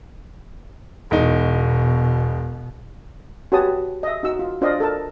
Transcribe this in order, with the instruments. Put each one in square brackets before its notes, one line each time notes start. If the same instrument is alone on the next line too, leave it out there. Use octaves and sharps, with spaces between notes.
[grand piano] E1 D#4 [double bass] B2
[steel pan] F#4 G4 B4 C#5 A5 D#6
D#5 E5
D#4 F#4 E6
F4
D4 F4 C5 D5 D#5 F5
A4 A#4 A5